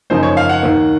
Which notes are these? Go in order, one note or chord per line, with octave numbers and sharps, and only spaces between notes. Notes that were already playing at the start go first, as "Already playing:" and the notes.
F#2 C#3 F3 A#3 D#4 C5
C#5
F5
F#5
D#2 D#3 A#3